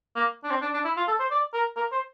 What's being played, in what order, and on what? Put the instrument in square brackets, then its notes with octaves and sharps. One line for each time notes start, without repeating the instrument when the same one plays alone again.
[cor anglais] A#3
D4
C4
D4
D4
E4
F4
A4
C5
D5
A#4
A#4
C5